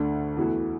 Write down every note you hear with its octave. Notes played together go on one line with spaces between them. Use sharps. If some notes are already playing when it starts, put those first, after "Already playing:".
Already playing: D2 D3 A3 D4
E2 E3 A3 F#4